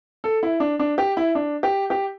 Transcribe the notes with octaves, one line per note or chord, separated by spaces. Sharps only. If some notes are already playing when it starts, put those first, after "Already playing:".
A4
E4
D4
D4
G4
E4
D4
G4
G4